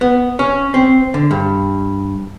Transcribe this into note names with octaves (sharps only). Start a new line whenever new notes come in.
B3
C#4
C4
D3
G2